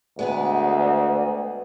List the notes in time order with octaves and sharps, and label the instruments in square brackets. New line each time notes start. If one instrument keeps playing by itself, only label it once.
[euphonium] D2 [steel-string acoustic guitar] G#3 B3 G#4